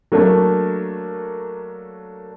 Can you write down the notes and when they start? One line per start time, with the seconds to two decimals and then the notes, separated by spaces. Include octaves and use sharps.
0.12 F#3 A3 A#3 D4 A4